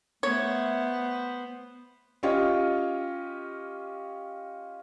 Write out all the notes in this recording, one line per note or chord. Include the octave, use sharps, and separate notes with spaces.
A3 B3 C5 C#5
C#4 F4 G4 C#5 D#5